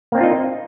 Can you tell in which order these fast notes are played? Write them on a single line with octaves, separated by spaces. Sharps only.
A#3 C4 D4 F4 D#4